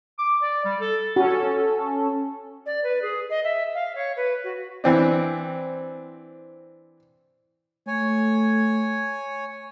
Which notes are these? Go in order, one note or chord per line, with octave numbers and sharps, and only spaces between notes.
D6
D5
G3
A4
C#4 F#4 A4
D5
B4
G#4
D#5
E5
F5
C#5
B4
F#4
E3 C4 D4
A3 C#5 G#5